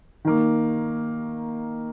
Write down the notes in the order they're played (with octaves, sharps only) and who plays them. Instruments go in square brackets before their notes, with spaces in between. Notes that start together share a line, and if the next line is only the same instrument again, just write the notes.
[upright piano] D#3 A#3